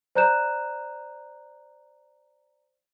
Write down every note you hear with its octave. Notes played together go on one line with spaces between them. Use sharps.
C5 D5 A#5 F#6 G6 E7